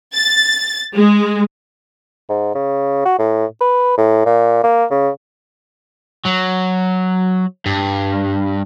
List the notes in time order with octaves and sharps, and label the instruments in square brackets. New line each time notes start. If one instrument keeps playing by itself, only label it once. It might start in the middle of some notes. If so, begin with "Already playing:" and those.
[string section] A6
G#3
[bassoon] G#2
C#3
F#4
A2
B4
A2
A#2
A#3
C#3
[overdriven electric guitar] F#3
G2